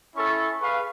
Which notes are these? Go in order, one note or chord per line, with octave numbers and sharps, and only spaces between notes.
C#4 E4 A4 C#6
G#4 B4 F5 C#6